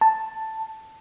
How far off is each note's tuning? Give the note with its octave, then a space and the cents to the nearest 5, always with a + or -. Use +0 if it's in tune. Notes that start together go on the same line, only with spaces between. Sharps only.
A5 +5